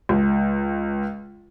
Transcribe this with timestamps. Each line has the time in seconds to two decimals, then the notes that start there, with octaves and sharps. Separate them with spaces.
0.09 C#2